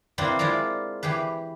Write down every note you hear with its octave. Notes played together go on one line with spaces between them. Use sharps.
A#3 C4 D4 E4 B4
G#3 D4 E4 F4 A#4
E3 G4 G#4 B4